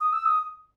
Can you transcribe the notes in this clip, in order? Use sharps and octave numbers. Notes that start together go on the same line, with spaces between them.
D#6
E6
D#6